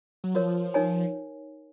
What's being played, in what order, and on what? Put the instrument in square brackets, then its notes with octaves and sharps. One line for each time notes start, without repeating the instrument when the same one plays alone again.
[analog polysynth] F#3
[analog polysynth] F3 [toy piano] F#4 A#4 C#5
[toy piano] D#4 A#4 C#5 G#5